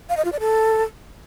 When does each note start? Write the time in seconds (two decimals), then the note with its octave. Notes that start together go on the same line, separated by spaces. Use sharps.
0.09 F5
0.17 D#5
0.25 F4
0.32 D5
0.40 A4